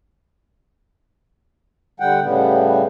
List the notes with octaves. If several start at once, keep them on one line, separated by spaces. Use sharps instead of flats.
D3 G3 F#5 G5
A2 C#3 G3 B3